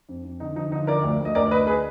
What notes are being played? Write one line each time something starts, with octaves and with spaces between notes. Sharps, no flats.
F2
F2
D3 D#4
F3 D#4
D3 D#4
F3 A#4 D5
D2
D2
D#5
D2 A#4 D5
D2 B4 D#5
G#4 B4